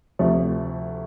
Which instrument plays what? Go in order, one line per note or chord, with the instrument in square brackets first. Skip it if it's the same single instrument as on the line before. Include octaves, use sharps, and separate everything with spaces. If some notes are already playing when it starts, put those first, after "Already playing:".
[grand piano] D2 C3 F3 A3